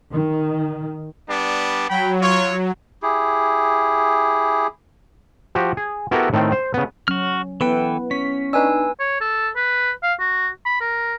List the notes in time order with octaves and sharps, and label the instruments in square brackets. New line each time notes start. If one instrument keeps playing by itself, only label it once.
[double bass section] D#3
[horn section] G3 B3 D4
[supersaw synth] F#3 [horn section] G5 B5
[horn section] F4 C#5
[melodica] E4 G4 G#4
[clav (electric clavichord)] F3 F#4 G4
G#4
B3 E4 F#4 G4 A4 A#4
A2 D#3 A3 C4
C5
C#3 B3
[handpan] F#3 C#4 [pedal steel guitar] F#4 F6
[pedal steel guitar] E3 A4 G5 [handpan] B3 E4 [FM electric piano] B4
[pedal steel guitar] C#4 [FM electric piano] B6
[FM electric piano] D4 D#4 [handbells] B4 G#5 E6
[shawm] C#5
A4
B4
F5
F#4
B5
A#4